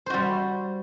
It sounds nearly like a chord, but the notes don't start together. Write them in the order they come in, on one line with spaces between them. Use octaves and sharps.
C5 F#4 G3